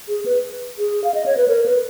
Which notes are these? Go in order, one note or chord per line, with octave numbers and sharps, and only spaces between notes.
G#4
B4
G#4
F5
D#5
C#5
B4
A#4
B4